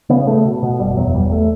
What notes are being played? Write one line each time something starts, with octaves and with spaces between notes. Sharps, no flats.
C#3 B3
C#3 A3
B2
B2
F#1 G3
E2 F#3
G1 G3
A3